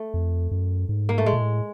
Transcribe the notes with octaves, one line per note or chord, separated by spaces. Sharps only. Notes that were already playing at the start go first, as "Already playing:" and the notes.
Already playing: A3
F2
F#2
G#2
A#3
A3
A2 G#3
A#2
A2